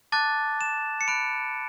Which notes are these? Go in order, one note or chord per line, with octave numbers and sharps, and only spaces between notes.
A5 D6 F#6 A6
E7
C#7
B5 F#6 D7